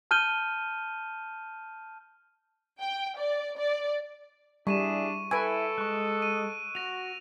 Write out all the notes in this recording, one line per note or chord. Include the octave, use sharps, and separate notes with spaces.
A5 F6 G6 D#7 G7
G5
D5
D5
G3 D4 E4 G#4 C#6 D#7 E7
E4 A4 B4 G#5 C#6 E6 D7
G#3 C#6 F#6
D#7
F#4 A#6 F7